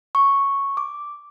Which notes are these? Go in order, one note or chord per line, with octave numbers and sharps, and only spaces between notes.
C#6
D6